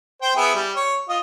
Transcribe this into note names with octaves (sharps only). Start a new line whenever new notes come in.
C5 G5
B3 E4 G#4
G3
C#5
F4 D#5